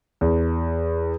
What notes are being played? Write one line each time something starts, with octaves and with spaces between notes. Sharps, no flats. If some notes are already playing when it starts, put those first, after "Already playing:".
E2